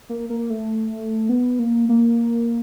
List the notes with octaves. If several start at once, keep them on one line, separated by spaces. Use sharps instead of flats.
A#3
A#3
A3
B3
A#3
A#3